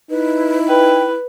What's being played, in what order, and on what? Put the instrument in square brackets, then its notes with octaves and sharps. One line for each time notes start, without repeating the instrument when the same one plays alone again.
[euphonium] D#4 [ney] E4 [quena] B4
[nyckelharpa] B4 [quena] G5